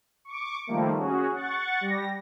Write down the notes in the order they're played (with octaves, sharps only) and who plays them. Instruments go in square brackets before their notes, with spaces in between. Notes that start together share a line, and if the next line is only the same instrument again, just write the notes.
[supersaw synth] C#6 D6
D#3 F3 G3 A3 A#3
C#4 F#4 G#4
F#5 C#6 A6
G3 G4 A#6